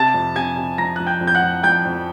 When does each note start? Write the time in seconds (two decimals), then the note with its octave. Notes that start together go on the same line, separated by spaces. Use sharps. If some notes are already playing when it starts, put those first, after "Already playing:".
Already playing: C3 A5 A6
0.14 F2
0.36 C3 G#5 G#6
0.57 C3
0.78 F3 A#5 A#6
0.96 F3 F#6
1.07 G5 G6
1.21 F2
1.27 G6
1.35 F#5 F#6
1.42 F2
1.63 F2 G5 G6
1.85 F2